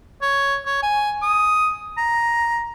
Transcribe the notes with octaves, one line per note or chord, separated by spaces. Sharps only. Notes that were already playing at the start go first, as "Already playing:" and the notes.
C#5
C#5
G#5
D#6
A#5